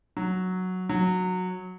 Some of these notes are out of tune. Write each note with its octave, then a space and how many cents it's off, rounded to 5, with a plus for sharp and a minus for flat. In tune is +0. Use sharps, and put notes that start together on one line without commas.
F#3 -5
F#3 -15